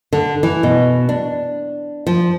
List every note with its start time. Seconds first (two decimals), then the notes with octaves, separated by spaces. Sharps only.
0.13 D3
0.43 E3
0.63 B2
1.09 D4
2.07 F3